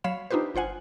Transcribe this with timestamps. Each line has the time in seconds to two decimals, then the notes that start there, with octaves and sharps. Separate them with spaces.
0.04 F#3 C#5 F5 B5 E7
0.31 D4 D#4 F4 G4 B4 C5
0.55 G1 F4 C5 F#5 G#5